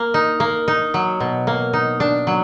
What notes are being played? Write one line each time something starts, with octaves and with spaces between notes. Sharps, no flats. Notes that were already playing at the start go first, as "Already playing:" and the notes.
Already playing: A#3
D#4
A#3
D#4
F#3
B2
A#3
D#4
D4
F#3